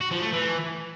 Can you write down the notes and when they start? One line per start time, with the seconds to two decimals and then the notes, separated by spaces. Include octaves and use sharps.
0.01 F#4
0.11 F3
0.22 A3
0.33 E3